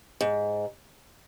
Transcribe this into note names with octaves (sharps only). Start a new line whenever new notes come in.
G#2